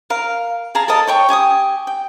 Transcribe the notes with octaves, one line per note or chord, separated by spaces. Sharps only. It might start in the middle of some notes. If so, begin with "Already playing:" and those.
A#4 F5
G#4 F5 A5 A#5
A4 A#4 D#5 A5
C#5 G5 C#6
G4 G#5 D6 D#6
G5